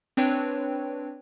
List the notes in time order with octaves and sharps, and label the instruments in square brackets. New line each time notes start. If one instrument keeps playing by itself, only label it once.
[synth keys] C4 D4 B4 C#5 G5